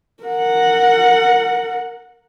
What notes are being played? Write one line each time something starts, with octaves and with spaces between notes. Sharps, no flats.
A#4 F#5